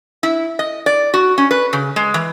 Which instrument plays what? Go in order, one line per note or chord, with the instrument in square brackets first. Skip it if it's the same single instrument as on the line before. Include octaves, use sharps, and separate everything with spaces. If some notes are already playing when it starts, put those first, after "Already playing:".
[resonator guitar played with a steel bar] E4
D#5
D5
F#4
C#4
B4
C#3
G#3
E3